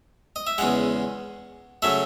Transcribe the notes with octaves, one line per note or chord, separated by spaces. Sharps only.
D#5
E5
E2 C#3 G#3 F#5
C#3 F#3 A3 E5